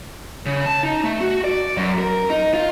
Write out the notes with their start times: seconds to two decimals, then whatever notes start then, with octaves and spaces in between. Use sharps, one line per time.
0.46 C#3
0.66 A5
0.83 D#4
1.04 A3
1.21 F#4
1.44 D5
1.77 F#2
1.98 A#4
2.30 D#4
2.54 F4